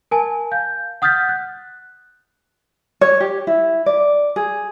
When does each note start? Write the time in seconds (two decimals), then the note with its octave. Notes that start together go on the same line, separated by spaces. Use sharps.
0.11 A#4 G#5 A5
0.51 F5 G6
1.02 F#5 D#6 F6 G6 A6 B6
1.29 F#6
3.01 C#5
3.20 G4
3.47 E4
3.86 D5
4.36 G#4